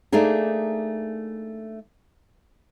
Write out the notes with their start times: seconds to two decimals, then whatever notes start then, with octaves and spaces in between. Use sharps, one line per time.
0.12 A3 A#3 D4 D#4 G#4